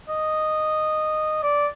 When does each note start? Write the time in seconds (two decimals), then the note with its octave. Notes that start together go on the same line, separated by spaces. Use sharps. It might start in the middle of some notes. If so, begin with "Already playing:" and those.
0.09 D#5
1.43 D5